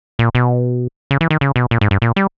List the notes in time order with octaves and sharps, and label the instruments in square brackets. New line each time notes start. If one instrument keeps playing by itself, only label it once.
[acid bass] A#2
B2
C#3
E3
D#3
C#3
B2
A#2
G#2
G2
A#2
G3